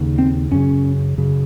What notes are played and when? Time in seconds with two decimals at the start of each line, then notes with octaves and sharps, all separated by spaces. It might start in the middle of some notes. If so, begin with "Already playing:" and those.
Already playing: D#2 C#3
0.18 C4
0.51 F#2 C#3 C#4
1.18 F#2 C#3